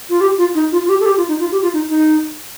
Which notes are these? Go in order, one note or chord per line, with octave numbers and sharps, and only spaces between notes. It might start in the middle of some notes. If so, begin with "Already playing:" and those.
F4
G4
F4
D#4
F4
F4
G4
A4
G4
F4
D#4
F4
G4
F4
D#4
D#4